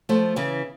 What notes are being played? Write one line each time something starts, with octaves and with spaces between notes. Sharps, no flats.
F3 A3
C#3 E3